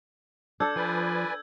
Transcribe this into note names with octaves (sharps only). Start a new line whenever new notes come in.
D4 A4 E6 G6 G#6
F3 B4 D5 G#5